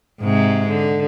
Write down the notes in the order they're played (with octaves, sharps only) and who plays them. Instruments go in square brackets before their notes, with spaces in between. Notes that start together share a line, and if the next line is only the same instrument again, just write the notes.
[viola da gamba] G#2 C3 G#3
D3